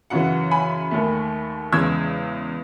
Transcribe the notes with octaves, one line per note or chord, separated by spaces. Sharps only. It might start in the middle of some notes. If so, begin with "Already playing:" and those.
F#2 C#3 E3 F#5
G#5 B5
D#2 D#3 A3
E2 C#3 G#3 E6 G#6